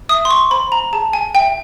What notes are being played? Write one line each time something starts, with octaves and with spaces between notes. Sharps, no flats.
E5 D#6
C6
C#6
C5 B5
A#5
G#4 A5
G#5
E5 G5